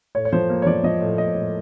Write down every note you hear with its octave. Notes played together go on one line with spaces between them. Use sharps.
A2 C#5
C#5
F3 C5
A#3
C#5
F3 D5
F3 D#5
A2
A2 D#5
A2